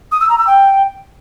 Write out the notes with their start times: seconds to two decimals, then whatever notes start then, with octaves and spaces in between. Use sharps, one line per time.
0.12 D#6
0.20 E6
0.29 A#5
0.38 E6
0.47 G5